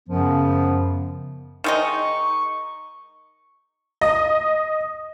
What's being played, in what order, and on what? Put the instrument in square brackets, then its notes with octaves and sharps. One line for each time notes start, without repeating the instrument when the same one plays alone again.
[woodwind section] F#2 C#3 F3 B3
[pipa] D#3 G#3 D#4 [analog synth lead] C#6
[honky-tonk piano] D#5